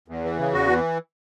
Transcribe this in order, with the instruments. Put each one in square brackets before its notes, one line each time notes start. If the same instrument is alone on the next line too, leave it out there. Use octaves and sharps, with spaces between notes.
[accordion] E2
E3
C#3
E2 F#4
E3